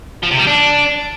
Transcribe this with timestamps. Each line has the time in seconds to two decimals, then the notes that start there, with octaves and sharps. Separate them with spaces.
0.23 F3
0.31 C3
0.39 G3
0.47 D4